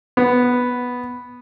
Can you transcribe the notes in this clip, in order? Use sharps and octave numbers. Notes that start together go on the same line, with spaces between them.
B3